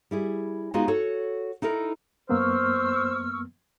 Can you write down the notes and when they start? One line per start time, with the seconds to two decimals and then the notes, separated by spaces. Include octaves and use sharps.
0.11 G3 E4 G#4
0.74 G#3 B3 D#4 F4 F#4 G#4
0.88 F#4 A4 C#5
1.62 D#4 E4 A4 A#4
2.29 F#2 A#3 B3 C5 C#6 E6 F6